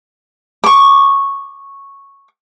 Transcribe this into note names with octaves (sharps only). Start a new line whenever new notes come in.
C#6 D6